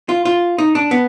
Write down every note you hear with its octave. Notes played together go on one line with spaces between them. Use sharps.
F4
F4
D#4
D4
B3